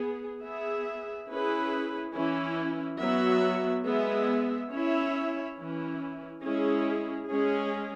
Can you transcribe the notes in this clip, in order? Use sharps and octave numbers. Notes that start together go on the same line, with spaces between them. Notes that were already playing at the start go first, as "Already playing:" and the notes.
Already playing: B3 G#4
B3 G#4 E5
C#4 E4 G#4 B4
E3 C#4 E4
F#3 B3 F#4 E5
G#3 B3 G#4 E5
C#4 E4 C#5 E5
E3 C#4 E4
G#3 C#4 E4 G#4
G#3 C#4 G#4